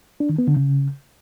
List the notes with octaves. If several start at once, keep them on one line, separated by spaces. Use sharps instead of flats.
D4
D#3
B3
D3
C#3